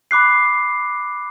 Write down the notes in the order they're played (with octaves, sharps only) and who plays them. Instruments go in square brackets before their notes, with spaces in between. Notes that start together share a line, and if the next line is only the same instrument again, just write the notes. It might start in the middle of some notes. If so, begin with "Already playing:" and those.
[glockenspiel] B5 D6 F#6 C7